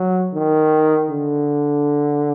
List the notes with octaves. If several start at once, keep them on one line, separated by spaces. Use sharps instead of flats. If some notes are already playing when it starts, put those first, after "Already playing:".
Already playing: F#3
D#3
D3